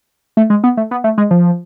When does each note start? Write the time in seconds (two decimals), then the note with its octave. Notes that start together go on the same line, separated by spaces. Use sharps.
0.37 A3
0.50 G#3
0.64 B3
0.77 A3
0.91 B3
1.04 A3
1.18 G#3
1.31 F3